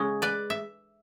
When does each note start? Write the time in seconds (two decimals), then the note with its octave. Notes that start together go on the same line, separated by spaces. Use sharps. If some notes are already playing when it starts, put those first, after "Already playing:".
Already playing: C#3 G#3 C#4 G#4
0.22 B4 D5
0.50 E5